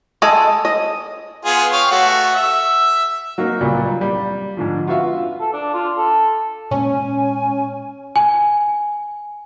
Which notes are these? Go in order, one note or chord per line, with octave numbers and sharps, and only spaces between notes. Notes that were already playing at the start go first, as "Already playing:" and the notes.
G#3 A4 D#5 G#5
D#5
B3 F4 G#4
C#5 F5 G5
A3 F#4
E5
F#3 A#3 D#4
C#2 A#2 F#3 G3
G3
G#2 D3 F3
F4 F#4 B4 E5 F5
A4
D4
F4
A4
A#2 G#3 C#4 G#5
G#5